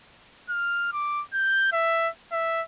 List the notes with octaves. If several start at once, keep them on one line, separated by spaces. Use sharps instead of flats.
F6
D6
G6
E5
E5